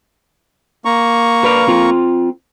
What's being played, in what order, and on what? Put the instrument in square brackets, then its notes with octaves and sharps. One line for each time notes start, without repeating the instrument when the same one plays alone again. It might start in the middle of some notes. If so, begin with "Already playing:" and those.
[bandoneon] A#3 A#5 C#6
[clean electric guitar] B4 D5 F5
C4 F4